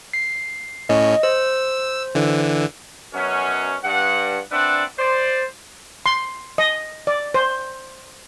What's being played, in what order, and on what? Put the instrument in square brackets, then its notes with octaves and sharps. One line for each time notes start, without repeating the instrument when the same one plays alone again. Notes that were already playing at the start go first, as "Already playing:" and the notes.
[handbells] C7
[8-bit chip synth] A2 C#4 [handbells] D#5
[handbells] C5 [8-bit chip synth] E6
[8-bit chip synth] D3 E3
[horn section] F#2 B2 F#3 C#4
G2 F#5
C4 D4 B4 D5 E5 F#5
C5 D5
[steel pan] C6
D#5
D5
C5